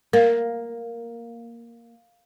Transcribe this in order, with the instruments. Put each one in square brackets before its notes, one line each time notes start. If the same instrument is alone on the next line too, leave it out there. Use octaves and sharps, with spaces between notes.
[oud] A#3 [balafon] A#4 F5